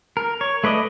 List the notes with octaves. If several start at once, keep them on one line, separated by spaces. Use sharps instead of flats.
A#4
C#5
A3 B4 D5 D#5